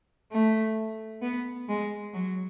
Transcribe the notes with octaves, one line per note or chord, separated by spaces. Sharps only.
A3
B3
G#3
F#3